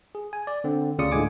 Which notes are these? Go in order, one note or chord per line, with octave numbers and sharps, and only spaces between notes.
G#4
G#5
D5
D3 C4
D2 C#3 F4 D5 D#6 C#7
A2 D3 G#3 G#5 D6